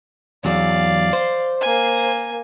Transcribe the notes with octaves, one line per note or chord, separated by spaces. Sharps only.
E2 F#3 D5 F5
C5
A#3 G#5